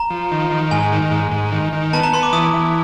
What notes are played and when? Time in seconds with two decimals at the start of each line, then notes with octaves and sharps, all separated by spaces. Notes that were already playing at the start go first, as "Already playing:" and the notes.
Already playing: A#5
0.10 F3
0.31 D#3
0.51 D#3
0.71 G#2 G#5
0.92 D#3
1.11 G#2
1.31 G#2
1.52 D#3
1.73 D#3
1.93 B3 A5
2.03 A#5
2.12 B3 C6
2.23 D6
2.33 E3 D#6
2.54 E3